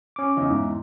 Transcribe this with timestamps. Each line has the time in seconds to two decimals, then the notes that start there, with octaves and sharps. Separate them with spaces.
0.16 C#4 D6
0.37 E2 C#3 D#4
0.50 E2 G#2 E4